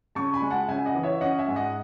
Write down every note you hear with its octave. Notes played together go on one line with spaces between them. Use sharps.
C#3 A5 C#6
G#5 B5
G#3
F#5 A5
C#3 E5 G#5
D#5 F#5
E3
C#5 E5
C#4 D#5 F#5
E5 G#5
G#2
D#5 F#5